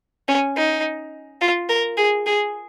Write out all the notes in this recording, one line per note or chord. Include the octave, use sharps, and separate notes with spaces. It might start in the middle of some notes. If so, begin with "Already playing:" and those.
C#4
D#4
F4
A#4
G#4
G#4